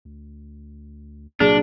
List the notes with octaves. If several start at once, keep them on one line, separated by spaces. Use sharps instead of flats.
D2
C2 A#2 F#3 D4 G#4